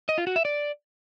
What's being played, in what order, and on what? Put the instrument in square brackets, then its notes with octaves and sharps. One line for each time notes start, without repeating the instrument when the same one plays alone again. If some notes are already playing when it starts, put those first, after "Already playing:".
[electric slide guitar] D#5
F4
F#4
E5
D5